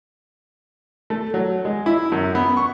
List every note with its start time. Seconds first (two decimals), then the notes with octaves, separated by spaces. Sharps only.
1.10 A3
1.34 F#3
1.65 G#3
1.86 E4
2.12 F#2
2.35 B3
2.57 C#6